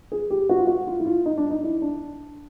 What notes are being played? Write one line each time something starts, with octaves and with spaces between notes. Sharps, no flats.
G#4
G4
F#4
F4
F#4
F4
E4
F4
D#4
D4
D#4
E4
D4